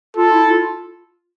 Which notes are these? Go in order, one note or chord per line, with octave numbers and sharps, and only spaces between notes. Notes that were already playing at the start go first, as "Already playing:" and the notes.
F4 A4
E4
F4